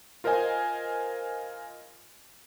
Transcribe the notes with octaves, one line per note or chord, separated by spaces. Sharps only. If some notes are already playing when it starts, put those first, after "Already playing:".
F4 A#4 C5 D#5 G#5